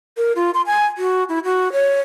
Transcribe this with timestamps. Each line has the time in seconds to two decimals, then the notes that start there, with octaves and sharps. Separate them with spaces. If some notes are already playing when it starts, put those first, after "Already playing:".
0.17 A#4
0.36 F4
0.54 C6
0.66 G#5
0.97 F#4
1.29 E4
1.44 F#4
1.72 C#5